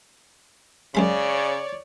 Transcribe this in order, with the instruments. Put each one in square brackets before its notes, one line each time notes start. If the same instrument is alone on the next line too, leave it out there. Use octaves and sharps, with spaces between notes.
[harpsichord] F#2 G#3 B5 [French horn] C#3 [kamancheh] C#5 D5